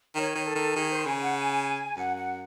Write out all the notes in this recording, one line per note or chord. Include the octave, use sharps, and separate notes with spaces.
D#3 C#5
D#3
A4
D#3
D#3 G#4
C5
C#3 G#5
F#5
G#5
F#2 F#5
F#5